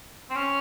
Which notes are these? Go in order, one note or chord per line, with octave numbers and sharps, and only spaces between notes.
C4
C#4